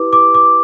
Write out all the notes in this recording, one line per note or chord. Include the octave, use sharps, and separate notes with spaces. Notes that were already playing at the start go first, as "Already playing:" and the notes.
Already playing: E4 G4 B4 D6
D6
D6